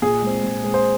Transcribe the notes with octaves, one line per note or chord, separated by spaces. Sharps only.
A#2 G#4
G#3 C4
A#2
G#3 C4
C5